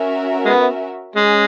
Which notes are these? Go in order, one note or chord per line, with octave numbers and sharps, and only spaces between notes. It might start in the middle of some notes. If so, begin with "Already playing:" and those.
Already playing: C#4 F#4 A#4 E5
G#3 B3
G#3 C#4 G#4